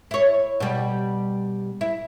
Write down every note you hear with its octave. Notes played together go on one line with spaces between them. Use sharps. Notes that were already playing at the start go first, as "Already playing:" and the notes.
E4 C#5
B2 G3
E4